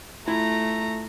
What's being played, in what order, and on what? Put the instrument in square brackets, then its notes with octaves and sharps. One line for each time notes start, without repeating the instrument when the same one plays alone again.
[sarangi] A3 [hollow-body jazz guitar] E4 F4 G#5 [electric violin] A#5